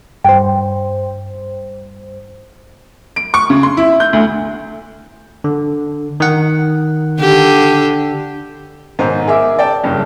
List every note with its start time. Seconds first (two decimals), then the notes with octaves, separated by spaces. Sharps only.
0.25 G2 C5 G5
3.16 D7
3.34 C#6
3.50 C#3
3.63 C6
3.77 E4
4.00 G6
4.13 D2
5.44 D3
6.20 D#3 F#5
7.20 D3 G4
8.99 B1 G#2 D#3 C5 A#5
9.28 G#4 A#4 E5 D6
9.59 D5 G5 A5
9.84 F#1 G2